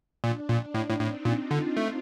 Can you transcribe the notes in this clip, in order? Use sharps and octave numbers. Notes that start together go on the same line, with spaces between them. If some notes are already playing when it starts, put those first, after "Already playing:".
A#2 D4
A#2
A2
A2
A2 C4 D#4
A#2
D4 F4
D3
A3